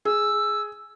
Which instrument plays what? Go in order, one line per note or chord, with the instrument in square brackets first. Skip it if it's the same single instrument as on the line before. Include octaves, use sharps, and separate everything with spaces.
[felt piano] G#4 [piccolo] E6